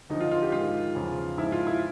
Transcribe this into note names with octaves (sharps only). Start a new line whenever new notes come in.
D2 D3 F3 D#4
F4
F4
G4
G#2 D#3 F4
E2 C#3 F3
G#2 F3 E4
F4
E4